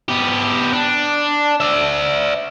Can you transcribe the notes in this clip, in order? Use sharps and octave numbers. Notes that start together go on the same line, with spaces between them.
B3 G4
D4
D5 E5